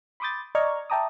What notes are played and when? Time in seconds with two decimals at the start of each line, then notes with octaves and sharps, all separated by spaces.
0.20 B5 C6 D6 D#6 G6 A6
0.55 D5 D#5 A#5 C#6 F6 G#6
0.90 E5 G5 A5 A#5 D6 D#6